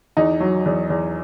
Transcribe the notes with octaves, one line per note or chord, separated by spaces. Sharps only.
E2 D#4
F#3
E2
E2